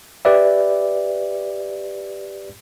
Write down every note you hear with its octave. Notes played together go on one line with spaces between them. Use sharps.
G4 B4 D5 E5